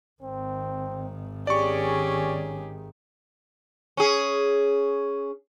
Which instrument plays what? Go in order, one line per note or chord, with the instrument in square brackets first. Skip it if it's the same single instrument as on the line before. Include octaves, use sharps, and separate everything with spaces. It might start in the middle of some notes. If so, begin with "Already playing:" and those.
[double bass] G#1 D#3 [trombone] C4
[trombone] C#4 [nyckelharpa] G4 G#4 [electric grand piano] D5 C#6
[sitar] C#4 G#4